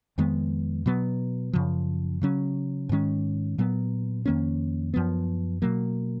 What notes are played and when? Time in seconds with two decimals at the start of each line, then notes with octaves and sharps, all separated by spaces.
0.18 F2 D#3 G#3 B3
0.86 B2 F#3 B3
1.53 F#2 C#3 F3
2.22 C#3 F#3 C#4
2.89 G#2 D#3 G#3 C#4
3.58 A#2 F#3 B3
4.26 F2 D#3 A#3 C#4
4.94 F#2 F3 B3
5.62 B2 F#3 A#3